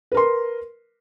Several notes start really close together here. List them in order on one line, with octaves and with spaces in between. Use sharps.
B4 A#4 C6